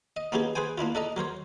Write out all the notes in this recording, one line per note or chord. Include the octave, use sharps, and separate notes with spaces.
D#5
A#3 B3 C#4 D#4 G4 G#4
G#4 B4 C5 G5 G#5
A#3 D4 E4 F4
D4 A4 D#5 A#5
F#3 A#4 C5 C#5